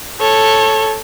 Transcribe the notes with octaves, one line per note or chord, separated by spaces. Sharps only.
A4 C#5